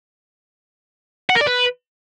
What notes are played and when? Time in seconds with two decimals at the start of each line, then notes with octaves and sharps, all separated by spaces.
1.30 F#5
1.35 A#4
1.41 D5
1.47 B4